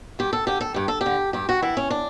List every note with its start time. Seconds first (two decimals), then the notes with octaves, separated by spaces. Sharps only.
0.19 G2 G4
0.33 A4
0.47 D3 G4
0.61 A4
0.74 G2 G4
0.88 A4
1.01 G4
1.06 D3
1.33 G2 G4
1.49 F#4
1.62 E3 E4
1.77 C#4
1.90 D4